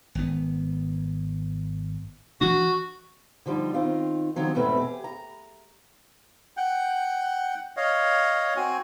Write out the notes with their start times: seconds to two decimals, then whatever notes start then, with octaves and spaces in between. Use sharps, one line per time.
0.15 G#1 B3
2.41 E3 F3 D4 F#4
3.46 D3 F3 G3 D#4
3.74 D#3 C4 D#4 F4
4.36 D3 D#3 F3 F#3 C4
4.55 E2 G#2 B2 A3 C4 B4
4.77 G4 G#4
5.04 A#5
6.57 F#5 G5
7.77 C#5 D#5 F5
8.57 C4 F#4 G#5